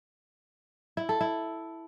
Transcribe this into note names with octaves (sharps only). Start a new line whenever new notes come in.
E4
A4
E4